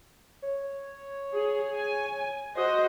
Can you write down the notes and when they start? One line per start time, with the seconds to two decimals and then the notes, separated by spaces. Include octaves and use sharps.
0.42 C#5
1.34 G#4
1.74 G#5
2.56 F#4 C5 D#5